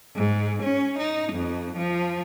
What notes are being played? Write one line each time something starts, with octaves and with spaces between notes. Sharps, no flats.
G#2
C#4
D#4
F2
F3